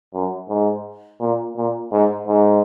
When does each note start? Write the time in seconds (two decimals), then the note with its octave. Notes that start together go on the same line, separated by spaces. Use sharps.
0.14 F#2
0.48 G#2
1.20 A#2
1.56 A#2
1.92 G#2
2.27 G#2